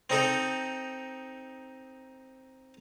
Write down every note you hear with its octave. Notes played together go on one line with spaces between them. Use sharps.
C4 D#4 A4